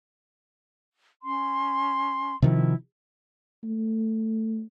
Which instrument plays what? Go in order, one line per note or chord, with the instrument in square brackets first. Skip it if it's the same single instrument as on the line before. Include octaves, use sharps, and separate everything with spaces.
[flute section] C#4 C6
[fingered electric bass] C3 D#3 F3 [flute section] E4
[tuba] A3